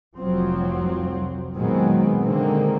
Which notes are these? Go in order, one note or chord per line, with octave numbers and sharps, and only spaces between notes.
F1 C2 F3 F#3 C4
A#2 D#3 F#3 G#3 B3 C4
D3 D#3 G#3 A#3 C4